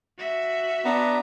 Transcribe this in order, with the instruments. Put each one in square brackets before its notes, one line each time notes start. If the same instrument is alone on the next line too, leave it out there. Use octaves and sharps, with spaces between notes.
[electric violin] F#4 E5
[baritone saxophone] B3 [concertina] D4 A#5